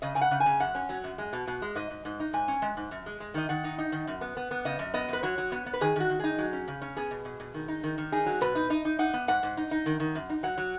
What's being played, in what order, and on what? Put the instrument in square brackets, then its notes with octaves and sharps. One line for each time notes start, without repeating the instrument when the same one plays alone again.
[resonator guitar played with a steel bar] C#3 D#5
C#3 G#5
F#5
C#3
G#5
C#3
F#2 F#5
C#4
F#3
F#2
G#3
B2
B2
G#3
G#2 D#5
G#2
G#2
D#4
G#2 G#5
C#4
G#3
G#2
F#2
G#3
G#3
D#3 D#5
D#3 F#5
D#4
D#4
D#3
F#2
B3
B3
B3
C#3 D#5
F#2
B3 D#5
F#2 B4
F#3 C#5
F#3
B3
B3
B4
D#3 G#4
D#3 F#4
D#3
D#4 G#4
F#3
C#4
C#3
C#4
B3 G#4
B2
B2
B2
D#3
D#4
D#3
D#3
D#4 G#4
F#3
B2 B4
D#4
D#4 D#5
D#4
D#4 F#5
B3
G#2 F#5
G#2
D#4
D#4
D#3
D#3
F#2
D#4
F#3 F#5
F#3